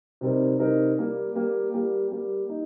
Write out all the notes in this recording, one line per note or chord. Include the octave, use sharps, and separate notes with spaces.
C3 G3 C4 D#4 A#4
C3 G3 C4 D#4 A#4
G3 A#3 G4
G3 A#3 G4
G3 A#3 G4
G3 A#3 G4
D#4